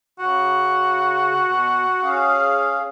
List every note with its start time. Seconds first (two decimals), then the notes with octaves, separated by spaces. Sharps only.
0.19 C#3 F#4
1.44 B2
2.02 C#4 G#4 F5